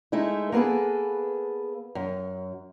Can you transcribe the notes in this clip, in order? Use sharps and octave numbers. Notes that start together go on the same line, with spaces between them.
G#3 A3 D#4 E4
A#3 B3 G#4 A4 B4
F#2